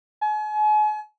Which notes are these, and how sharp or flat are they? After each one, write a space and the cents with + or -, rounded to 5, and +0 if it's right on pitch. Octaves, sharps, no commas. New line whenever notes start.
G#5 +40